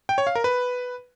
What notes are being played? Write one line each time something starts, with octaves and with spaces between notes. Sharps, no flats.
G5
C#5
F5
A#4
B4